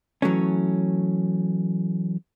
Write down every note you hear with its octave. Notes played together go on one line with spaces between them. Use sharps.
E3 F#3 A3 C#4